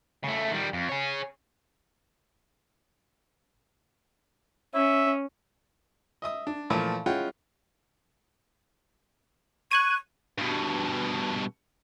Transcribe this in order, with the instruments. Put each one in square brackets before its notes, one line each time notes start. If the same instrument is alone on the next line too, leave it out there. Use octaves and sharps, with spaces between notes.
[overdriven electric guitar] C#3 A3
D#3 G3
F2
G#4 C#5
[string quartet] C#4 [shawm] E5
[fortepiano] D#5 E5 D#6
D4
A#2 E3 F3 A3
G#3 C#4 E4 F4 F#5 G5
[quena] C#6 [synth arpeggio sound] F#6 G#6 D#7
[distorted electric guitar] G2 B2